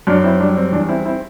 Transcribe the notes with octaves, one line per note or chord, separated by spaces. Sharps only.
F#2 D4
C4 E4
G3 D4
C4
E2 D4
C4 E4
C4 E4